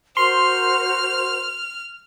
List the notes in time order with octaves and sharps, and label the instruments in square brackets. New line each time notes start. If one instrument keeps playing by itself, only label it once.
[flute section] F#4 A#4 C5 [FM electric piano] C6 [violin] F6